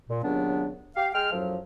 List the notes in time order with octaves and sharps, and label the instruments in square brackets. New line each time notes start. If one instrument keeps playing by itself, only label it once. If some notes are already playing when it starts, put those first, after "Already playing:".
[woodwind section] A#2
D#2 A#2 C#3 F#3 B3 D4
G4 F5
G#3 G5 F6
F#2 A2 F3 F#3